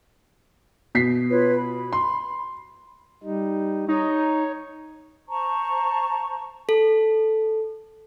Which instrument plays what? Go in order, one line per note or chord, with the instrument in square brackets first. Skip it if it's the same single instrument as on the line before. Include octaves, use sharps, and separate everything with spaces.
[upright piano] B2 B6 C7
[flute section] F4 B4 C#5
B5
[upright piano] C6
[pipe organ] G3 D#4
[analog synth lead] D#4 [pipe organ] C#5
[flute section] C5 A5 A#5 C#6
[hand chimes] A4